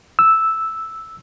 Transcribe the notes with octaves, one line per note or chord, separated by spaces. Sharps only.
E6